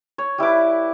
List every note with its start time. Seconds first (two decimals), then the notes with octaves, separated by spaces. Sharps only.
0.18 C#5
0.38 G3 E4 B4 D6